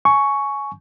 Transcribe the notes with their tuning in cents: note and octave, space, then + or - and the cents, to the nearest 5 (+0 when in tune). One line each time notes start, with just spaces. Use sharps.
G#5 +20 C#6 +5